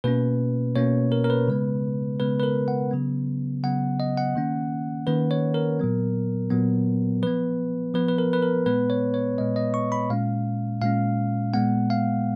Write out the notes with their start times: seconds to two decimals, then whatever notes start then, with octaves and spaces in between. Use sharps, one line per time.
0.04 B2 A#3 C#4 B4
0.76 B2 A#3 C#4 C#5
1.12 A#4
1.24 A#4
1.30 B4
1.48 C#3 G#3 B3
2.20 C#3 G#3 B3 B4
2.40 B4
2.43 A#4
2.68 F#5
2.91 C#3 F#3 B3
3.63 C#3 F#3 B3 F#5
4.00 D#5
4.18 F#5
4.35 D#3 A#3 C#4
5.07 D#3 A#3 C#4 B4
5.31 C#5
5.54 A#4
5.80 A#2 F#3 B3
6.50 A#2 F#3 B3
7.22 F3 B3 B4
7.94 F3 B3 B4
8.08 B4
8.18 A#4
8.33 B4
8.43 A#4
8.66 A#2 G#3 B3 B4
8.90 C#5
9.14 C#5
9.38 A#2 G#3 B3 D#5
9.56 D#5
9.74 C#6
9.92 B5
10.10 A#2 G#3 C#4 F5
10.81 A#2 G#3 C#4 F5
11.54 A#2 G#3 B3 F#5
11.90 F5